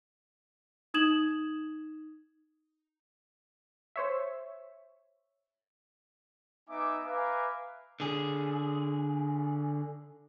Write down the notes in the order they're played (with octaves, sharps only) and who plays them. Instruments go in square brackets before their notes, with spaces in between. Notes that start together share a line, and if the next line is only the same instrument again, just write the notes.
[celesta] D#4 D#6 G#6 E7 F#7
[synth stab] C5 C#5 E5
[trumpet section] B3 D#4 E5 G#5 D6
B4 E5 F5 G#5 A#5 D6
[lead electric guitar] D3 G#4